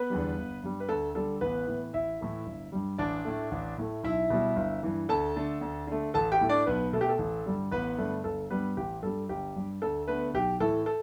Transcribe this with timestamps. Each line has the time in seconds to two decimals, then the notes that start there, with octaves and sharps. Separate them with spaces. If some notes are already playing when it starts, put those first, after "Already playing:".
Already playing: B3 B4
0.10 E2 D3 G3
0.37 G1
0.63 G2 G3
0.80 B4
0.88 D2 A4
1.15 D3 G3 A4
1.41 A1 B3 B4
1.67 A2 E3
1.93 A1 E4 E5
2.21 A2 E3 A3
2.46 G1
2.72 G2 G3
2.98 A1 D4 D5
3.25 A2 A3
3.51 A1
3.78 A2 A3
4.03 B1 E4 E5
4.30 B2 G3
4.56 G1
4.83 G2 E3
5.09 D2 A4 A5
5.36 D3 A3
5.61 D2
5.87 D3 A3
6.14 A1 A4 A5
6.32 G4 G5
6.41 A2 A3
6.49 D4 D5
6.66 B1 B3 B4
6.93 B2 A3 A4
7.01 G4
7.09 A4
7.19 A1
7.46 G2 D3 G3
7.71 A1 B3 B4
7.98 G2 D3 A3
8.24 G1 A4
8.50 G2 G3 B3 B4
8.77 A1 G4
9.02 G2 G3 A4
9.29 G1 G4
9.56 G2 G3
9.82 D2 A4
10.08 D3 A3 B3 B4
10.34 B1 G4
10.60 A2 E3 A4
10.86 A4